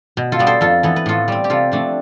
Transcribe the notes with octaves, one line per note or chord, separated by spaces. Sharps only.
B2
F4 A4
G3 B3
A4 C5
F2 F4 A4
E3 B3 A4
B4
A2 F4 A4
G3 C4
G4
C3 F4 A4
F3 A3 C4 D4